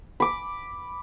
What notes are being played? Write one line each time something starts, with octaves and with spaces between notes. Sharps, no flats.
B5 D6